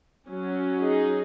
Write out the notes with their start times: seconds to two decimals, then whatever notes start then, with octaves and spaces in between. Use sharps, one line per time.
0.29 F#3 C#4
0.80 D#4 G#4